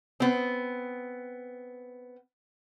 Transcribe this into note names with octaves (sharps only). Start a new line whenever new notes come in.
B3 C4